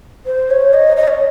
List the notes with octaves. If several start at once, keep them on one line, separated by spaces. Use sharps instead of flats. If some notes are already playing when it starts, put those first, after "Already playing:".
C5
C#5
D#5
D#5
C#5